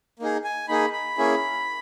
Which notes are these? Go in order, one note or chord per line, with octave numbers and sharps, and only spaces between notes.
A#3 D#4 G#4
G#5
A#3 D#4 G#4 B5
B5
A#3 C#4 E4 G#4